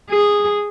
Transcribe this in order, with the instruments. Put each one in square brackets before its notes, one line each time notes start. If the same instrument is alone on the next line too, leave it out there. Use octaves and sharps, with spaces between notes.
[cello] G#4